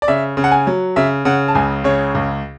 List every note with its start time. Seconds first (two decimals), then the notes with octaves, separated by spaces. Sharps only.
0.02 D5
0.08 C#3 E5
0.37 C#3
0.44 F#5
0.52 G#5
0.67 F#3
0.96 C#3 E5
1.25 C#3 F#5
1.48 A5
1.55 C#2 G#5
1.84 C#3 C#5
2.15 C#2